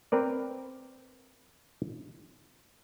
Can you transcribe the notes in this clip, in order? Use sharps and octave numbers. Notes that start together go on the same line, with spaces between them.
C4 A#4 B4 D5